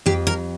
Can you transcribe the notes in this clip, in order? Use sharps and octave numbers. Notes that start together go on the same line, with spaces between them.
F2 G4
A#4